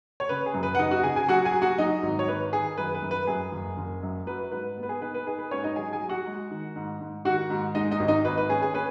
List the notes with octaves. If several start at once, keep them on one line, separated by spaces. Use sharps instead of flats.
C#5
C#3 B4
G#4
F#2
B4
F#5
C#3 D#4 D#5
F#4 F#5
C#3 G#4 G#5
G#4 G#5
F#3 F#4 F#5
G#4 G#5
F#3
F#4 F#5
F#3 D#4 D#5
G#1
C#5
D#3 B4
D#3 G#4
F#2 B4
B4
F#2
B4
F#2 G#4
F#1
F#1
F#2
F#3 B4
G#2 B4
B3
B4
G#4
D#4 B4
B4
D#4 G#4
B4
G#2 C#4 C#5
D#4 D#5
F#3 G#4 G#5
G#4 G#5
F#3
F#4 F#5
G#3
D#3
G#2
G#2
D#3 F#4 F#5
G#2
G#3 D#4 D#5
D#4 D#5
G#1
D#4 D#5
G#1 B4
B4
C#4 G#4
G#4
C#4 B4